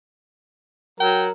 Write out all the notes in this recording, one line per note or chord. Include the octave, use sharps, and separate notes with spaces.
F#3 A#4 G5